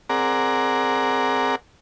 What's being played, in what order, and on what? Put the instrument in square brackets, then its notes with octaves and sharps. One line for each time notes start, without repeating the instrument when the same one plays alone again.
[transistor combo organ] C4 G#4 A#4 D5 F#5 A#5